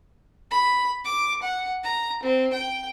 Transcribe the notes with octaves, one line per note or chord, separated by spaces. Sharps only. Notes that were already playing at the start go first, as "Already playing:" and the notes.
B5
D6
F#5
A#5
C4
G5